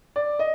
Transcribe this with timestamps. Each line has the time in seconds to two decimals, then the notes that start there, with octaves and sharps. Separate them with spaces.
0.16 D5
0.39 D#5